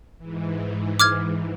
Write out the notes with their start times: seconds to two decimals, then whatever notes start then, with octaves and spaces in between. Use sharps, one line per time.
0.18 G#2 E3
1.00 D6 F6 G#6